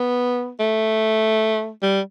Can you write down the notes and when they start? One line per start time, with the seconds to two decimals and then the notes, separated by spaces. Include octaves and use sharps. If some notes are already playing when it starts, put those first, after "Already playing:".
Already playing: B3
0.60 A3
1.82 G3